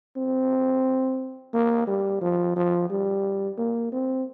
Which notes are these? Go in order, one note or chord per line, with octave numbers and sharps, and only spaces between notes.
C4
A#3
G3
F3
F3
G3
A#3
C4